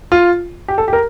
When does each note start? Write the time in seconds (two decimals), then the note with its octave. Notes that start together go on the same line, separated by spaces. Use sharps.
0.12 F4
0.68 G4
0.78 A4
0.88 G4
0.93 A#4